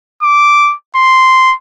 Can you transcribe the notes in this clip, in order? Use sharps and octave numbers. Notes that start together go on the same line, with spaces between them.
D6
C6